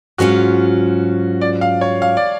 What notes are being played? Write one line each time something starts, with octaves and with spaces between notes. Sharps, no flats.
G#2 F#3 C#4 F4 F#4
D5
F5
C#5
F5
D5